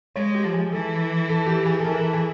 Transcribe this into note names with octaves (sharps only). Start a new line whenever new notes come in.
G#3 C#5
G4
F3
G#4
E3 A4
A4
G4
G#4
A4
E3 A#4
A4
G#4